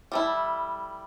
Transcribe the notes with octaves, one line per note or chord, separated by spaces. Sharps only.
G3 A3 E4